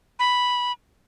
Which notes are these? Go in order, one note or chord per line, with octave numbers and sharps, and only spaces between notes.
B5